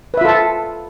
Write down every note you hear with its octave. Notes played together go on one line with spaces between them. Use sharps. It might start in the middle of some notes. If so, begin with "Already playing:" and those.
F4 A4 B4 E5 A5